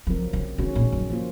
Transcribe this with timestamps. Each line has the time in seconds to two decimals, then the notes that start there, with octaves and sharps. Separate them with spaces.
0.07 C#3 F3 F#3 C4 F4 A#4
0.33 C#3
0.58 C3 D#3 G#3 C#4 F#4
0.75 A#2
0.92 F#2
1.10 F3 A#3 F4